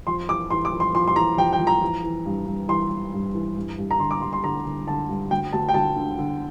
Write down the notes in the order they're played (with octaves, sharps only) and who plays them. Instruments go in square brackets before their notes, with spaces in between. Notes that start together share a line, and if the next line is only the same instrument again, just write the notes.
[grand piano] F2 C6
E3 D6
E3 C6
D6
F2
C6
F2 C6
C6
E3 A#5
F2 G5
G5
F2
A#5
E3
E3
G2
G2
E3 C6
E3
G2
E3
G2
G2
A#5
D3 C6
D6
G2 C6
C6
D3 A#5
D3
D3 A5
G2
D2 G5
D2 A5
G5
D2 A5
D3
D3